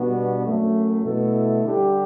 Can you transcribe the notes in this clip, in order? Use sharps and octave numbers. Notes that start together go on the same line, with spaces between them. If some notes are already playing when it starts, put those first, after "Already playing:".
Already playing: B2 G3 B3 D4 F#4
F#2 F#3 A3
B2 A3 E4 A4
D3 G3 D4 G4